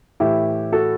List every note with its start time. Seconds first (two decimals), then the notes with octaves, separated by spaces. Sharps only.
0.20 A2 E3 E4 G4
0.72 F#4 A4